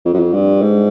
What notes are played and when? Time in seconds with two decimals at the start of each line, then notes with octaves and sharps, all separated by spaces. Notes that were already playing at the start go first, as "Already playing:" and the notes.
0.05 F2
0.13 F#2
0.20 F2
0.33 G2
0.61 G#2